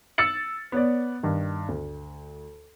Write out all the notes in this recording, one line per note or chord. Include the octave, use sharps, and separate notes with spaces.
E6 A6 C#7 F#7
B3 C#5 D5
G2 D#3
D2